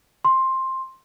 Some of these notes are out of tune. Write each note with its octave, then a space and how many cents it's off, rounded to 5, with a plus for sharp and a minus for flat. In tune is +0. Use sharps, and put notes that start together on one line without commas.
C6 +10